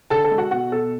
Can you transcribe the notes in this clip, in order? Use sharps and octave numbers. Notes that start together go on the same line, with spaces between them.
D3 A4 A5
A4 A5
G#3
F#4 F#5
B2 F#4 F#5
B2 A4